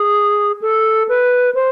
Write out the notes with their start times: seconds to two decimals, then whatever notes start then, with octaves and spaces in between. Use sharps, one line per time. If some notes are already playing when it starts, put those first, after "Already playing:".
Already playing: G#4
0.62 A4
1.09 B4
1.55 C5